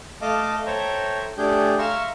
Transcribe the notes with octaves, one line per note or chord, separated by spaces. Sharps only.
A3 D#5 F5 A5 D6
A4 C5 C#5 E5 G5 A#5
A3 D4 G4 G#4 G6
E5 F5 A#5 C6 C#6 E6